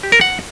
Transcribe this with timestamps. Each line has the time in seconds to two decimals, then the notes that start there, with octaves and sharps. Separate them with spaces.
0.03 G4
0.12 A#4
0.21 F#5